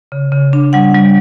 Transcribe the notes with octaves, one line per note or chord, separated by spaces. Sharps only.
C#3
C#3
D4
G3 F#5
G3